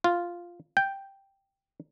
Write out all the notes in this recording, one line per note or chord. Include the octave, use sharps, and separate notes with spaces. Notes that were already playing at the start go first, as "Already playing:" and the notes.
F4
G5